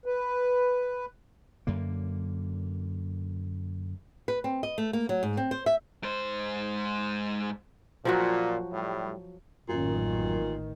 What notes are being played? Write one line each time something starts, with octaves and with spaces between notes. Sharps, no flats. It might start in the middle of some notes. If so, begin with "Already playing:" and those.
B4
F#2 D3 A#3
B4
C4
D#5
A3
A#3
F#3
G#2
C4
C5
E5
G#2 C5
A#2 F3 F#3 F#4
A2 G3
A1 F#2 A#2 D#3